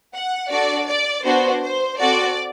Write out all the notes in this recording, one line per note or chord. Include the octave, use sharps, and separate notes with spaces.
F#5
D4 F#4 A4 D5
D5
B3 D4 F#4 C5
C5
C4 F#4 A4 D5